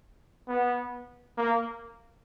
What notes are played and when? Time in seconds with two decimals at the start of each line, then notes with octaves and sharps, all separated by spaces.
0.48 B3
1.37 A#3